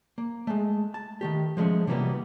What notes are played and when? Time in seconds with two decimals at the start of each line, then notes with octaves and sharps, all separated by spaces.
0.18 A#3
0.47 G#3 A3
0.94 A5
1.21 D#3 A3 G4
1.57 F3 G#3 A3 C#4
1.87 C3 E3 F#3 G3 A#3 B3